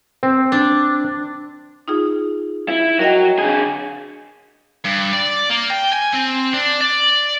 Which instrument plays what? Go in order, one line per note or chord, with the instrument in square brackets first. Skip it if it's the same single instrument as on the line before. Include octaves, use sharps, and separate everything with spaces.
[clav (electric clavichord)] C4
[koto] D4
[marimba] D#4 F4 G#4
[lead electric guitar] E4
[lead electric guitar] F#3 [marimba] A#4 D#5 G5
[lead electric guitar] D3 G#4
[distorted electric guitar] G2
D5
A#3
G5
G#5
C4
D4
D5